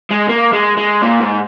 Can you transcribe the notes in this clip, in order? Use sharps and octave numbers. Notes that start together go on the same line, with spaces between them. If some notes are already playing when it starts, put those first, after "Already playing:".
G#3
A#3
G#3
G#3
A#2
G#2